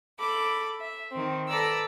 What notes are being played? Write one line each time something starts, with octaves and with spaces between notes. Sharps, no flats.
A4 B5 D6
E5
D#3 C4
A4 B4 D5 A#5 E6